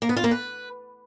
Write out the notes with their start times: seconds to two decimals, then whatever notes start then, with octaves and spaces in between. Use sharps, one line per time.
0.02 A#3
0.09 B3
0.17 F4
0.24 A#3
0.31 B4